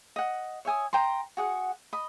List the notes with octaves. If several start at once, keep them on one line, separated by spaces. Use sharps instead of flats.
D#5 F#5
C#5 E5 G#5 D#6
G5 A#5 C6
F#4 G#4 F#5
D#5 B5